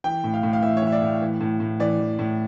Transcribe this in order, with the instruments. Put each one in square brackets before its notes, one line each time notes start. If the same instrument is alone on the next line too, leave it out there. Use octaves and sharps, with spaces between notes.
[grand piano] E3 G5
A2
F5
A2
F5
E3 E5
C#5
E3 E5
D5
A2
E3
A2
A2
E3 D5
E3
A2